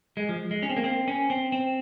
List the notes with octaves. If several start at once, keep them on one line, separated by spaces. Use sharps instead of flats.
G#3
F3
G#3
C#4
C4
A#3
C4
C#4
C4
C4